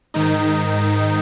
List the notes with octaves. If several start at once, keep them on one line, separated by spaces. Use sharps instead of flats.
G#2 D#3 D#4